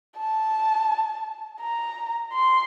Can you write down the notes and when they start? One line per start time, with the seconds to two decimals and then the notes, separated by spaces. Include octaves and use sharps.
0.17 A5
1.61 A#5
2.33 C6